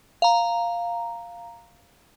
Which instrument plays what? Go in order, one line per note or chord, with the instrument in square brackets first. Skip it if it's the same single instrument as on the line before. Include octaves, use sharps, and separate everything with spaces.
[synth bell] F5 A#5